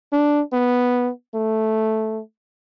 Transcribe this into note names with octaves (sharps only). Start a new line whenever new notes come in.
D4
B3
A3